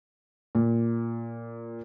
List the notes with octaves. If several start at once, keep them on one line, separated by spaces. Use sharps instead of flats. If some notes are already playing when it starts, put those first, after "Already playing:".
A#2